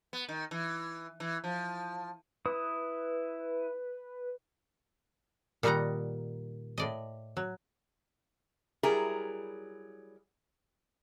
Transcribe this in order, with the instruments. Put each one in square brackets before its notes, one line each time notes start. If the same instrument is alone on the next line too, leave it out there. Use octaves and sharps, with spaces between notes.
[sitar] B3
D#3
E3
E3
F3
[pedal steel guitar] E4 D#6 [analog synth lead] B4
[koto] A#2 D#3 G3 D#4 F#5 A#5
A2 D5 D#5
F#3
[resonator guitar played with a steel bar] F#3 G3 E4 G#4 A#4